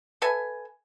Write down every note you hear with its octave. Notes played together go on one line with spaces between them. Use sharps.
A4 B4 E5 G#5